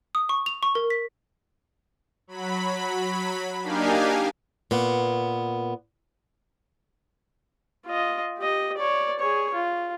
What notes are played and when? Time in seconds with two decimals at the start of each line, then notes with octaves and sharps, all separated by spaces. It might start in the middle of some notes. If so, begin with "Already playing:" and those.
0.15 D#6
0.29 C#6
0.46 F7
0.63 C#6
0.75 A#4
0.90 B6
2.27 F#3 B5
3.63 A#3 D4 D#4 G4 F5 G#5
4.71 A#2 B3
7.87 F4 D#5
8.38 G4 D#5
8.77 C#5 D5
9.19 G#4 C#5
9.54 F4